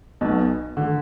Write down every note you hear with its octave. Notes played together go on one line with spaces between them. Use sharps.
B1 B2
D3